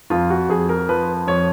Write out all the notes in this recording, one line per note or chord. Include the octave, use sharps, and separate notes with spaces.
F2 F4
F#4
F2 G#4
A#4
F3 B4
F2 C#5